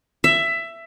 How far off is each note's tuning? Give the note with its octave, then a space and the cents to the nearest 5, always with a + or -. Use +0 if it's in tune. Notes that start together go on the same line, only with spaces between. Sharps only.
E5 +15